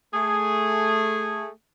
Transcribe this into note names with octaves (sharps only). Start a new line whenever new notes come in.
A3 G#4